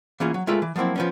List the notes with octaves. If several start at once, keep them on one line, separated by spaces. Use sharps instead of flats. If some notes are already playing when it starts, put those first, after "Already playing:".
E3 A#3 C#4 F4 G#4
F#3
G#3 A3 F4 A#4 E5
E3
F3 F#3 A#3 C4 E4
F3 B3 C#4